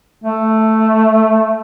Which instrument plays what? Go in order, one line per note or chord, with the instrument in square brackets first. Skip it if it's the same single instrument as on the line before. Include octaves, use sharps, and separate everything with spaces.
[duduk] A3